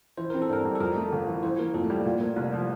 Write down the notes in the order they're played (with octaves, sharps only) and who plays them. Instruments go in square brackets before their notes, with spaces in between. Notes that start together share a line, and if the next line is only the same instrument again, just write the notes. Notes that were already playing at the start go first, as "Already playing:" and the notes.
[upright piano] E3 [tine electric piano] C5
[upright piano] C4 [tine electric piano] A#4
[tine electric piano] A4
[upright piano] G2 [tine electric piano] A#4
[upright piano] G3
[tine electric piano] A4
[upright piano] F2 [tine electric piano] A#4
[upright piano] A3
G1
E3
[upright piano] E3 [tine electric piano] C5
[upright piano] A#3 [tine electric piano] A#4
[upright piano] F2 [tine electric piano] A4
[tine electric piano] A3
[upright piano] G3 [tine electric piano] A#3
[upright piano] A#2 [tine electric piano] A#3
[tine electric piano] A3 [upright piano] A#3
[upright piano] C2 [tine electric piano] G3
[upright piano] F3